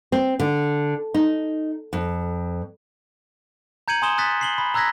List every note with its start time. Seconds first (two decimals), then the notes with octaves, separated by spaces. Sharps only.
0.12 C4
0.40 D3
1.14 D#4
1.93 F2
3.88 A#5 G6 G#6 C#7 D#7 F#7
4.02 G#5 C6 D#6 E7 G7
4.18 D#6 F#6 A6 B6
4.41 C7 F#7 G7
4.58 B5
4.74 A#5 E6 F#6 G#6 A#6 B6